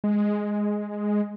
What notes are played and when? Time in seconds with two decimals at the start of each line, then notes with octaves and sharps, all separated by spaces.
0.04 G#3